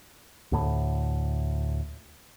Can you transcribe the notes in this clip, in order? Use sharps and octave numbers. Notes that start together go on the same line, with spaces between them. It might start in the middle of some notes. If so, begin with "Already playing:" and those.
D2 A2